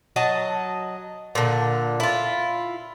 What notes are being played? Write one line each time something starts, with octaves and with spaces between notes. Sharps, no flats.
F#3 D#5 A5
A#2 D3
E4 F4